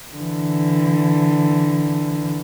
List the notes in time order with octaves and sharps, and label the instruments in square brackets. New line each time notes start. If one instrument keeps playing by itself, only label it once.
[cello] D3 E3